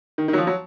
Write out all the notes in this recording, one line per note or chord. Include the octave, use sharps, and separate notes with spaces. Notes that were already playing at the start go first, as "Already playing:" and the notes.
D#3
D#3
F#3
F3
F#3